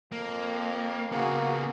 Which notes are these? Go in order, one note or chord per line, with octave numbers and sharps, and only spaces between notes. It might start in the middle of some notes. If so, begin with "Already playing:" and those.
F2 A#3
C#3 A#3 B3 F#4 G#4